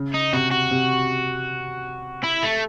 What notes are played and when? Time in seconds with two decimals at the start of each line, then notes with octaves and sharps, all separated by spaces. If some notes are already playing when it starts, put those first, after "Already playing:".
Already playing: C#3
0.14 D#4
0.33 C3 F#4
0.51 F#4
0.71 C3
2.24 E4
2.43 A3